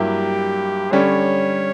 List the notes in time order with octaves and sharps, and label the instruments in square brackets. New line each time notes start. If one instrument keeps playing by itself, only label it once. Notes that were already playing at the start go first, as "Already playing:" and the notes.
Already playing: [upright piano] G2 F#3 A#3 E4 [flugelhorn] G4
[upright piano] D3 G3 C#4 [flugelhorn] C#5